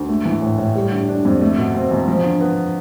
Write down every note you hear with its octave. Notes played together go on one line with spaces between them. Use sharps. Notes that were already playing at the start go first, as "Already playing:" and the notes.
Already playing: D2
A3
E3
A2
A2
G3
D3
D4
F2
A3
B2
C4
E2
F3
D3
B3